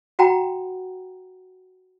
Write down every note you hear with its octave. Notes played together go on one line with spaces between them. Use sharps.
F#4 F#5 G5 A#5 B5